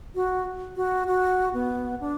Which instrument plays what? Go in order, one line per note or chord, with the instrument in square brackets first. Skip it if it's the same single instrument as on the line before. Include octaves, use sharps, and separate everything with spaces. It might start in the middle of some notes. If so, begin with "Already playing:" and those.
[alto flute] F#4
F#4
F#4
B3
D4